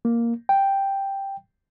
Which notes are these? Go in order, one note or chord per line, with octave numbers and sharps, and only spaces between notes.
A#3
G5